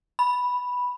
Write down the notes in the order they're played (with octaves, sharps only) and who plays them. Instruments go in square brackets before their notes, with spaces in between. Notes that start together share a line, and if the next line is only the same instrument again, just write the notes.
[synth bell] B5